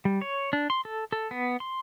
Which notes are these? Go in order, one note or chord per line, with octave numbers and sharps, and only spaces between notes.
G3
C#5
D4
C6
A4
A4
B3
C6